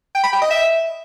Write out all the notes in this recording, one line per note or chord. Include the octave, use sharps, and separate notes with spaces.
G5
B5
G5
D#5
E5